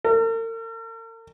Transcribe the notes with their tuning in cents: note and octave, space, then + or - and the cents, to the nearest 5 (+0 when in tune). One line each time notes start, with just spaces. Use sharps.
A#4 -45